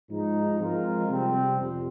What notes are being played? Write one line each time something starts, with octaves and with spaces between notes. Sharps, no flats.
G#2 F3 G#3 D#4
F3 G#3 C4 F4 A#4
C3 G3 C4
F2